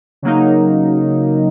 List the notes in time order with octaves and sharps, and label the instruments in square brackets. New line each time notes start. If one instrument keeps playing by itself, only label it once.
[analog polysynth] C#3 F#3 A#3 D#4